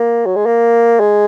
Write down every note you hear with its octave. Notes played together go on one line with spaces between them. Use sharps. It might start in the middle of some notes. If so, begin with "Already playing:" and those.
Already playing: A#3
F#3
G#3
A#3
G#3